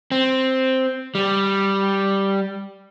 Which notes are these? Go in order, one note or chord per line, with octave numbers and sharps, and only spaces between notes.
C4
G3